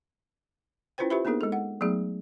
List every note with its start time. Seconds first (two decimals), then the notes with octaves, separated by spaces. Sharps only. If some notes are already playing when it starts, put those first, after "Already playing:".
0.98 C#4 E4 F4 B4 C5 G5
1.10 F4 G4 B4 C5 E5 B5
1.25 A#3 B3 D4 D#4 G#4 A#4
1.41 G#3 A4
1.52 F#5
1.81 F#3 A3 B3 D#4 G#4